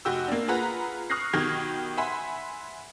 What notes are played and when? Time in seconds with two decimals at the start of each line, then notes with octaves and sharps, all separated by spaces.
0.05 F1 F#4 G4 E6
0.28 A#3 D4
0.48 F4 G#4 B4 F#5 A#5 B5
1.10 C#6 D#6 F6 F#6 A#6 C7
1.33 B2 D#3 G4 F6 G#6 A#6
1.97 E5 F#5 G#5 B5 C6